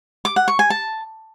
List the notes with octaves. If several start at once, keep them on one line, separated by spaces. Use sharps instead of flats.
D6
F#5
C#6
G#5
A5